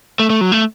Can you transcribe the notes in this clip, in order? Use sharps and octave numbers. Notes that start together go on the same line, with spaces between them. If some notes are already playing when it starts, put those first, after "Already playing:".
A3
A3
F#3
A3